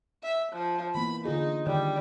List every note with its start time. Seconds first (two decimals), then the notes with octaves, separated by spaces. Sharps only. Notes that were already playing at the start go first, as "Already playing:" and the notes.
0.23 E5
0.53 F3
0.95 E3 A#3 B3 B5
1.25 D3 D#4 F4 G#4
1.66 D3 D#3 G3 D5